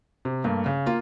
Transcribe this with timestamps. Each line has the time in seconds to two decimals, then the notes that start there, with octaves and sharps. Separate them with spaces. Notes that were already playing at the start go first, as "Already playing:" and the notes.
0.25 C3
0.44 G2 A3 A#3
0.66 C#3
0.86 A#3 F4